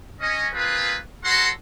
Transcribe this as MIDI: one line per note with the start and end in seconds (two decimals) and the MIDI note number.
0.21 0.47 61
0.21 0.47 75
0.53 0.96 58
0.53 0.96 60
0.53 0.96 65
0.53 0.96 68
0.53 0.96 71
1.24 1.49 66
1.24 1.49 69
1.24 1.49 73
1.24 1.49 78
1.24 1.49 82
1.24 1.49 84